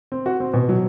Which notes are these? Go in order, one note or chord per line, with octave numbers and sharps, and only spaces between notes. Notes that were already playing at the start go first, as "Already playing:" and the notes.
C4
F#4
C4
B2
F#3